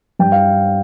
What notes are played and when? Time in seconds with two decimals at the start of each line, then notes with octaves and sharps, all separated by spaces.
0.19 G2 G5
0.32 F5